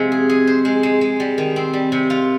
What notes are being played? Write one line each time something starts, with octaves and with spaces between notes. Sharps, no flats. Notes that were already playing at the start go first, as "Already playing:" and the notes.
Already playing: C3 F3 G#3
G#4
G#4
C5
G#3
G#3
G#3
G3
D#3
C4
G3
C3
F4